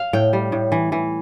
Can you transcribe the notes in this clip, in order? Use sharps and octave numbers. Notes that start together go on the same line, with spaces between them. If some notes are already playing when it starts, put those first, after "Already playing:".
Already playing: F5
A2 G5
G3
A2
E3
E3